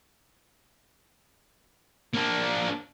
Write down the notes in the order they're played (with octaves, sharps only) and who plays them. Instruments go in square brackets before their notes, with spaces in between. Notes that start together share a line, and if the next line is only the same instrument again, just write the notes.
[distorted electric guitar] A#3 D4